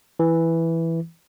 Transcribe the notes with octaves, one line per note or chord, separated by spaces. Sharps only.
E3